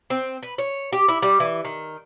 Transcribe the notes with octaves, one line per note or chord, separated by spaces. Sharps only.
C4
B4
C#5
G4
E4
G3
E3
D#3